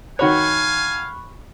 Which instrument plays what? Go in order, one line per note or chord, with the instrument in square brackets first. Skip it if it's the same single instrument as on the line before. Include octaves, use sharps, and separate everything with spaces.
[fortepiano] D#3 F#4 C#5 [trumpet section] F5 G#5 [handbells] B5 C#6 F#6